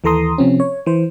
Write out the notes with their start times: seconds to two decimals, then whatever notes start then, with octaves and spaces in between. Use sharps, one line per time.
0.04 D#2 E3 A4 A#5 C6 D#6
0.38 C3 F3 C4 C#4
0.60 C#5
0.86 E3 C5